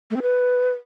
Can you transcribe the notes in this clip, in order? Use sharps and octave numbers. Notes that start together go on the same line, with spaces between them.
A3
C4
B4